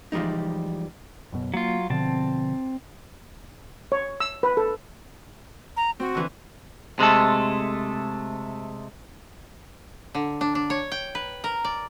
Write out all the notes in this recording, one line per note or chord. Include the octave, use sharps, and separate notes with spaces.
E3 F3 G3 G#3 D#4
F#1 F#2 B2
F#3 A#3 F4
B2 D3 F3 C4 A5
C#5
E6
B4
A4
A#5
C4 F#4
D3 E3
C3 G#3 A3 A4
D3
D4
D4
C#5
G5
B4
A#4
D5